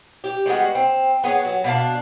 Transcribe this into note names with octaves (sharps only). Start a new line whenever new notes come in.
G4
G3 G#3 B3 F#4
C4
B3 G#4 C#5
F#3
B2 D4 F5 A5